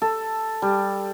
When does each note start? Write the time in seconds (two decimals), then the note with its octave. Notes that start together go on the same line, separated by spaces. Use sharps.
0.02 A4
0.62 G3